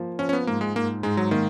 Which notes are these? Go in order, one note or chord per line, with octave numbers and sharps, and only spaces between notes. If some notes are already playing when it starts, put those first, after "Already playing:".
Already playing: F3 A#3
F3 C#4
C#4
B3
G#2 A#3
G#3
G#2 A#3
G#2 G#3
F#3
D#3 A#3